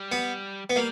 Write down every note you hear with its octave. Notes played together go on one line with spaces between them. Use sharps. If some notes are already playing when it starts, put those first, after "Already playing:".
Already playing: G3
B3
B3
G3 A#3